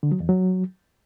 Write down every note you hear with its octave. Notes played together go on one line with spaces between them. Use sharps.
D3
F#3
E2
F#3